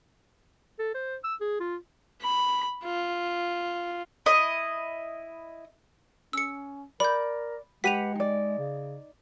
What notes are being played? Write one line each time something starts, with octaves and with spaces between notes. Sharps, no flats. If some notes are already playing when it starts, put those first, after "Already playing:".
A4
C5
E6
G#4
F4
B5
F4
E4 D#5
C#4 E6 C#7
A#4 D5 B5 G6
G#3 G4 B4 F#5 B6 D#7 F7
D#4 D5
C#3